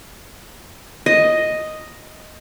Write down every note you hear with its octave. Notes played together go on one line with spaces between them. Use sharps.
D#5